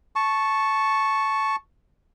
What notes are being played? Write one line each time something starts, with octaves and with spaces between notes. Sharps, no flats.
A5 C#6